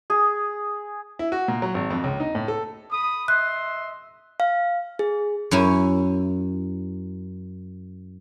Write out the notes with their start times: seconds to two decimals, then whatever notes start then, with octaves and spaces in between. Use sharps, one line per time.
0.10 G#4
1.19 E4
1.32 F#4
1.48 A#2
1.62 F#3
1.74 G#1
1.90 F2
2.04 C#2
2.20 D#4
2.35 A2
2.48 A4
2.91 B5 D#6
3.28 D#5 E5 C6 F#6
4.40 F5
4.99 G#4
5.51 F#2 C#4 E4